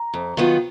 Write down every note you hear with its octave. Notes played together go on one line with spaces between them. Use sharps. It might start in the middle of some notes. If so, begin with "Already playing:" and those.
Already playing: A#5
F2
D#3 F#3 B3 F4